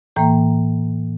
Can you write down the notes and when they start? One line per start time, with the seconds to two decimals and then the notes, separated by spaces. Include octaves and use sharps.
0.16 A2 E3 A#3 G5 A#5